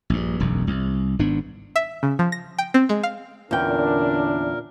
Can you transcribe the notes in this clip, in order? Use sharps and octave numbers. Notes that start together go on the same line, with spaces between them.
A#1 G2
E1 B1 F#2
C2
G#1 G#2 B3 D4
E5
C#3
F3
A#6
G5
C4
G#3
F5
E2 A#2 D3 C#4 D4 A#4 G5